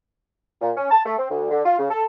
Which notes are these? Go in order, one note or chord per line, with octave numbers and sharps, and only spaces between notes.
A#2
C#4
A5
A3
C4
D2
D3
F4
C#3
A4